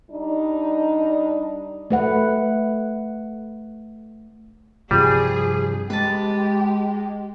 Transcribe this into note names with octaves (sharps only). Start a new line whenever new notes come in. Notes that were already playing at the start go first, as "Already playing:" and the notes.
G3 D4 D#4
A3 B4 F#5
G2 C3 F3 G3 G#4
G#3 G4 B4 A5